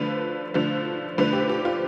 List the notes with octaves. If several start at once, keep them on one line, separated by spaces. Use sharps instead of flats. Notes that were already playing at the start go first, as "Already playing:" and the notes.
Already playing: D3 F3 A3 B4
D3 F3 A3
D3 F3 A3 B4
G4
G4
F4